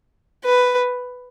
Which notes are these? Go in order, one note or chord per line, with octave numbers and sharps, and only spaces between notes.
B4